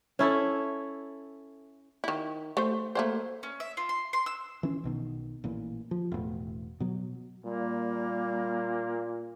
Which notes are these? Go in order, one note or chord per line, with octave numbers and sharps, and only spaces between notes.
C#4 E4 A4
D#3 E4
A3 C5
A3 A#3 C5
C#4
E5
F4
C6
C6
E6
E3 C#4
B1 B2 D#3
A1 A#2 E3
F3
E1 A2
B2 F#3
A#2 G3 A#3